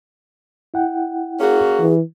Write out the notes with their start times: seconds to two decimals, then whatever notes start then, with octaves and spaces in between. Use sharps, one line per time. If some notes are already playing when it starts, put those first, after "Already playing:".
0.74 E4 F#5 G5
1.40 A#3 C#4 F#4 G#4
1.80 E3